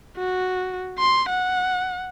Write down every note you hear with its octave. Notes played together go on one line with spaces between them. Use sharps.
F#4
C6
F#5